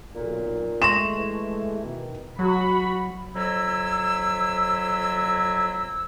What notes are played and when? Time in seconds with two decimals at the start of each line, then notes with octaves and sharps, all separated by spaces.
0.15 B1 A#2
0.82 G#3 A3 C6 C#6 A#6 E7
1.18 E3
1.83 B2 D#3
2.39 F#3 F#4 B5
3.36 F2 F#3 E4 E6